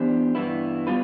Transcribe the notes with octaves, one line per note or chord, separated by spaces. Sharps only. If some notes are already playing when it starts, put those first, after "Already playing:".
Already playing: E3 B3 D4 G4 C5
G2 E3 B3 E4
G3 B3 F4 B4